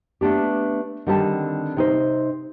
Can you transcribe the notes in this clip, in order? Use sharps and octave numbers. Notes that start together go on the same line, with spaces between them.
A3 B3 D4 G4
D3 D#3 G3 C4 A4 A5
C3 D#4 C5